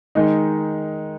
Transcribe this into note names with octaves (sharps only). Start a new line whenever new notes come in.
D#3 G#3 D#4